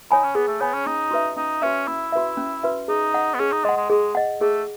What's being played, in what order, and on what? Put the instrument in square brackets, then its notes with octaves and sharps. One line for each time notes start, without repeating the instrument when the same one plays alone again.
[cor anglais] D#4 [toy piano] C#5 G#5 B5
[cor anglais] C#4
[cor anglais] B3 [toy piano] G#4
[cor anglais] A3
[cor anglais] B3 [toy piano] C#5 G#5 B5
[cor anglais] C#4
[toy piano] C#4 [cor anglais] D#4
[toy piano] F#4 B4 E5
[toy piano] C#4 [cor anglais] D#4
[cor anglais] C#4 [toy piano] F#4 B4 E5
[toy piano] C#4 [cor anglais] E4
[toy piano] F#4 B4 E5
C#4
F#4 B4 E5
[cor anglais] D#4 [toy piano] G#4
[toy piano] D#5 F#5
[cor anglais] B3
[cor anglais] C#4 [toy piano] G#4
[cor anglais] D#4
[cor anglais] G#3 [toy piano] D#5 F#5
[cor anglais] G#3
[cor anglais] G#3 [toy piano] G#4
[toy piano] D#5 F#5
[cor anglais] A3 [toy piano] G#4